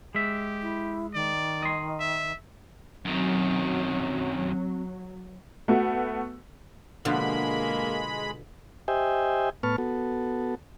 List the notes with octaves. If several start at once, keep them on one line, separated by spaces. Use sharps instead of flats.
G#3 G4 E5
E4
D#3 D5
D#5 C6
E5
F#2 D#3 F#3 C4
A3 B3 F#4
B2 D3 F3 G#3 A#3 B5
G4 C5 D#5 E5 G5 G#5
A2 B3 B4 A5 C#6 F6
B3 F#4 A4